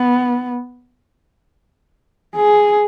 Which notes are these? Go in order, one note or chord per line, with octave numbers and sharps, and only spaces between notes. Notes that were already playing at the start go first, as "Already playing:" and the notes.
Already playing: B3
G#4